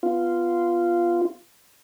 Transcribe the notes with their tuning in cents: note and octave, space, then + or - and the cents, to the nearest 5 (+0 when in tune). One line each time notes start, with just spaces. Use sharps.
B3 +0 F4 -10